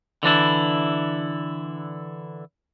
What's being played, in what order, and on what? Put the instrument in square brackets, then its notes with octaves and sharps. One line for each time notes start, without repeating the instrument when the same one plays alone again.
[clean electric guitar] D3 E3 D4 E4